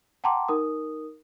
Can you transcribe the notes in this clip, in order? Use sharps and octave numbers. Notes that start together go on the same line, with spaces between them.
F#5 G5 A5 A#5 C6 D6
D#4 A#4 D#6